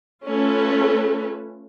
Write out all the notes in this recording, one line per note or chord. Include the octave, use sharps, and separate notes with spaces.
A3 C#4 F4 A4 B4